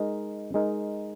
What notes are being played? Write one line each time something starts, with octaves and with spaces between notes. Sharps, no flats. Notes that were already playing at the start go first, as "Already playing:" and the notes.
Already playing: G#3 D#4 A#4
G#3 D#4 A#4